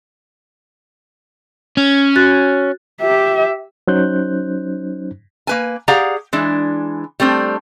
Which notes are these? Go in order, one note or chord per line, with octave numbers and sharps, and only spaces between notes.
C#4
F#4 F#6 A6
G4 E5
F#3 C#4 D#4 C5 F#6 G6
A#3 B4 G#5
G4 G#4 D5 F5 F#5 A#5
E3 G#3 D4
G3 A3 C4 D4